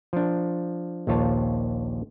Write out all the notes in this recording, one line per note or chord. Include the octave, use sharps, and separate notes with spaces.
F3 D4
A#1 D#2 F4 C#5 A5